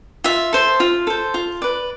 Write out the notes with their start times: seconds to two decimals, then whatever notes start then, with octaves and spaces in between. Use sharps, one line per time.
0.24 F4 E5
0.53 A4 C5
0.80 F4
1.07 A4 C5
1.34 F4
1.62 B4 D5